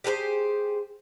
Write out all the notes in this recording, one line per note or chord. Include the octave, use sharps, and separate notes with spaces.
G4 G#4 A#4 C5